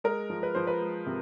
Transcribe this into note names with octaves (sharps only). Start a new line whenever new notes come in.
G#3 A#4
F3
B4
F3 C5
B4
G#3
C3